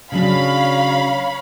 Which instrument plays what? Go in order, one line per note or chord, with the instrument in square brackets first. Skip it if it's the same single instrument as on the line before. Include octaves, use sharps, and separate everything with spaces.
[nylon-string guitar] C#3 F#3 D4 [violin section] C#5 F5 B5